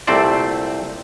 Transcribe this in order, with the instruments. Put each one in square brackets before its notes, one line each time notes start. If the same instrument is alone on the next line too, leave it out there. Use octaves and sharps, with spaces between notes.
[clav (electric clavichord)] C2 A#2 A3 C4 C5 D5